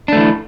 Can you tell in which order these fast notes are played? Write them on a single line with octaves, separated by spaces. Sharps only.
D4 A3 E3